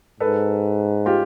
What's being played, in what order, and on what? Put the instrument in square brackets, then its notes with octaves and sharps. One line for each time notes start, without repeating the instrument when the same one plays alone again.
[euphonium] G#2 [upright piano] A4 B4
[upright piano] F4 G4